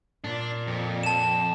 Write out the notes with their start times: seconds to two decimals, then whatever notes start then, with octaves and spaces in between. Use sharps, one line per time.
0.24 A#2 D4
0.67 F2
1.03 A5 E7